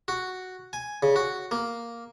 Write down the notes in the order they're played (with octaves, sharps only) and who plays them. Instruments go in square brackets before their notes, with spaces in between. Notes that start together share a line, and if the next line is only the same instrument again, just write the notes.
[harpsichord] F#4
G#5
C#3
F#4
A#3